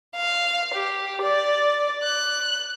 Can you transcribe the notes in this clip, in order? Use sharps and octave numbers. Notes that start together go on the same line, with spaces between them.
F5
G4
D5
F#6